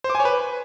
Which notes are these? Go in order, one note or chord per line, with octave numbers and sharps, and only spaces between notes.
C5
D6
G#5
C#5
B4